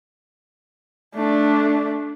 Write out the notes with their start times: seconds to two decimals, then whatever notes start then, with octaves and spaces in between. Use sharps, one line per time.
1.15 A3 D4